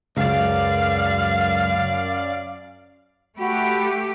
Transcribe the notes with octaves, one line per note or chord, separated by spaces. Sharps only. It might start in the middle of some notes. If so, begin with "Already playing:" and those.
C#2 F#2 D5 F5
A3 F#4 G4 B5